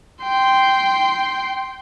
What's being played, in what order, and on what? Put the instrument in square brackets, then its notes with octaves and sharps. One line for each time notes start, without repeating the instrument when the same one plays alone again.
[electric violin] G5 C6